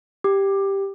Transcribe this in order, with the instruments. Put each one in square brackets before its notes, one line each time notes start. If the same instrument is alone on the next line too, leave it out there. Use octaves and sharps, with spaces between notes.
[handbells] G4